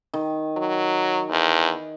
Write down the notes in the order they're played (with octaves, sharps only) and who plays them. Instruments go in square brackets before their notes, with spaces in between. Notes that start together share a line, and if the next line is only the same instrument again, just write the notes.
[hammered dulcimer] D#3
[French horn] F#3
E2